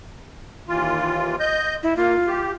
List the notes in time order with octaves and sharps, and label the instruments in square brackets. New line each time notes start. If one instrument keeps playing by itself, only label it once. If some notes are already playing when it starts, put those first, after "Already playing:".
[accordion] D#2 E3 F4
D#5 G6
[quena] E4
[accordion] A#3 [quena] F4
[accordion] G4